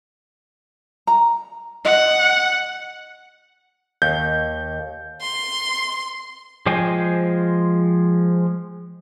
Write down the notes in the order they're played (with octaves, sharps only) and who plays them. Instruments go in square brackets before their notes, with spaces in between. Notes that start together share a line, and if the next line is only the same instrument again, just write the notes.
[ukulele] A#5
[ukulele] D#5 [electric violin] F#5
[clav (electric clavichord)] D#2 [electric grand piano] G6
[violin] C6
[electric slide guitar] F3 G#3 C5 G5 G#5